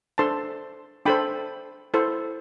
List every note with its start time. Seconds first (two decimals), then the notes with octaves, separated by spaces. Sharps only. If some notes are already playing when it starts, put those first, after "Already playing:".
0.18 D4 A4 C5 A5 C6
1.05 D4 A4 C5 G5 B5
1.94 E4 A4 C5